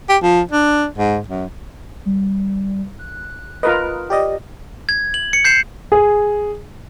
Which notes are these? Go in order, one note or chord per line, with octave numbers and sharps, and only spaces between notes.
G4
F3
D4
G#2
F#2
G3
F#6
F4 A#4 B4 D#5
G4 D5 D#5
G#6
F#7
C#7
G6 C7 E7
G#4